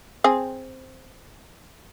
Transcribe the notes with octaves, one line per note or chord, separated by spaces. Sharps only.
C4 G#4